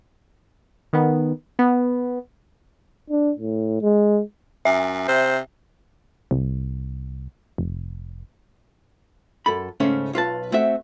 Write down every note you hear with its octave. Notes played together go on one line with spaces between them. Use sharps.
D#3 B3
B3
D4
A2
G#3
F#2 E5
C3 C5
C2
F1
F#2 A4 B5
G#2 C#3 A3 C#4
B1 F4 B4 A5
A3 C4 F#4 E5